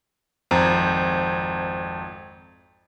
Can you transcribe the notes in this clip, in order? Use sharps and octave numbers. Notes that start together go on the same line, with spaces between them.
G#1 F2 C5 A#5